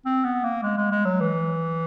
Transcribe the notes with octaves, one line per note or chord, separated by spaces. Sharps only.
C4
B3
A#3
G#3
G#3
G#3
F#3
E3